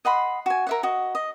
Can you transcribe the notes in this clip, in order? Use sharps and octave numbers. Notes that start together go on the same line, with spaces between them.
D#5 F#5 B5 C6
F#4 G#5
A#4 E5 F#5
F#4 D#5
D#5